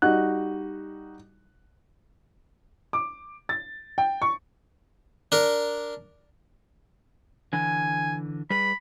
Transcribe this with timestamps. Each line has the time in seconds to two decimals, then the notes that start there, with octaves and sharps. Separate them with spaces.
0.02 G3 D#4 F#4 F#6
2.93 D6
3.49 A6
3.98 G5
4.22 C#6
5.32 D4 A#4
7.53 D3 E3 G#5
8.50 G3 G#4 B4 B5